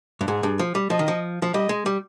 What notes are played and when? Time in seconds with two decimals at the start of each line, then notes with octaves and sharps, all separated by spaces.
0.21 G2
0.27 G#2 G#4
0.43 G2
0.59 F3
0.75 G3
0.90 F3 D#5
0.99 D#3
1.08 F3
1.42 F3
1.54 G3 D#5
1.69 G#3
1.86 G3